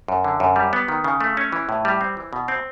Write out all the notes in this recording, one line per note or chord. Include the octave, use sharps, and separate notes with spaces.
F#2
D3
F#2
G3
B3
D#3
C#3
A3
C#4
E3
A2
G3
C4
E3
B2
C4